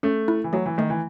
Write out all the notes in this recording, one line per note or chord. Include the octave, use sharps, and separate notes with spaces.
A3 C#4
E4
E3
F#3 A3
E3
D#3 A3
E3